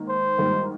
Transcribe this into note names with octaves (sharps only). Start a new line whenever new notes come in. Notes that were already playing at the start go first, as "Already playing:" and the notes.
Already playing: G#2 D#3 A#3
C5
G#2 D#3 G3 A#3